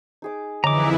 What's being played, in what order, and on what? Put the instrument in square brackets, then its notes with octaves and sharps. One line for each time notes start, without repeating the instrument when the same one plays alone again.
[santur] D#4 G#4 D6
[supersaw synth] F2 E3 E4 [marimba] D3 [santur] G#3 D#4 [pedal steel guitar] A#5 D6